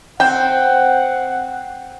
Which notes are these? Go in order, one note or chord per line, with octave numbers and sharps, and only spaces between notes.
C4 F#5 G5